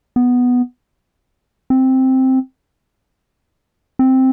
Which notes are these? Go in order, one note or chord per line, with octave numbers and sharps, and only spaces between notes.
B3
C4
C4